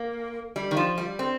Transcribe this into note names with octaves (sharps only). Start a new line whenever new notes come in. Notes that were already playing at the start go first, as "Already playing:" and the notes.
Already playing: A#3
G3
D#3
F3
G3
C4